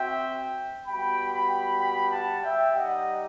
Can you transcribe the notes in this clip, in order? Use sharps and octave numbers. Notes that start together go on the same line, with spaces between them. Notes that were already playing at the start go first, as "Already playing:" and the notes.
Already playing: C4 F#4 E5 G5
G3 B3 F#4 G5 B5
G5 B5
G5 B5
F#5 A5
E5 G5
G3 D#4 G4 D#5 F#5